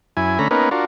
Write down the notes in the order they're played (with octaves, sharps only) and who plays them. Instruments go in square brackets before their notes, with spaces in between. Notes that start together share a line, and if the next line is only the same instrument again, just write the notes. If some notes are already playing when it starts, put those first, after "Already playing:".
[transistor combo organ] F#2 E4 G#5
D3 A3 C#4 A#5 B5
A#3 B3 C#4 D#4 A#4 B4
D4 F4 F#4 A#4